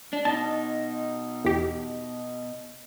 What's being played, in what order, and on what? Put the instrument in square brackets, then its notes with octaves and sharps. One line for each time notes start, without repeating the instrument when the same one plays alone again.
[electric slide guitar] D4
[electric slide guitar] B2 D#4 [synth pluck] A5
[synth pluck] E2 G4